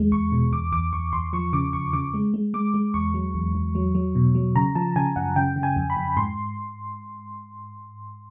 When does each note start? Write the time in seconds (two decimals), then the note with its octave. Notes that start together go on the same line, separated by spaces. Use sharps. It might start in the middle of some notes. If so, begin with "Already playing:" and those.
Already playing: E2 G#3
0.12 E2 C#6
0.32 B2
0.52 E2 D6
0.72 E2 D6
0.93 E2 C#6
1.13 E2 C6
1.33 F3 C#6
1.53 C#3 D6
1.73 F2 C#6
1.93 C#3 D6
2.14 G#3
2.34 G#3
2.54 G#3 D6
2.74 G#3
2.94 E2 C#6
3.14 F#3
3.34 E2
3.55 E2
3.75 F#3
3.95 F#3
4.15 B2
4.35 F#3
4.55 C#3 A#5
4.75 F3 A5
4.96 C#3 G#5
5.16 F#2 F#5
5.36 C#3 G5
5.56 C#3
5.63 G#5
5.76 F2
5.90 B5
5.97 F2
6.17 G#2 C6